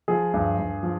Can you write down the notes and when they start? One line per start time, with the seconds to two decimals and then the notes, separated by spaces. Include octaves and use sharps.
0.08 F3 G#4
0.34 G2
0.59 G2
0.83 F3